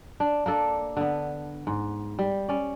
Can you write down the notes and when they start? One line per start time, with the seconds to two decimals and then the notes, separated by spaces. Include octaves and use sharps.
0.20 D4
0.46 A#3 D4 A4
0.97 D3 B3
1.67 G#2
2.19 G3
2.49 C#4 D5